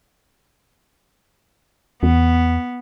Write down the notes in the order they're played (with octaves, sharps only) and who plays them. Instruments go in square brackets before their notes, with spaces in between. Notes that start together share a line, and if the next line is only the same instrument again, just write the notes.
[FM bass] E2 [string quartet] B3